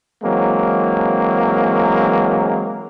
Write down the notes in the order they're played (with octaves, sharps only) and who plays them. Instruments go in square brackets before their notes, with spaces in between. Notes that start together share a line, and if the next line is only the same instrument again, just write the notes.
[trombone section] E3 F#3 G#3 A#3 C4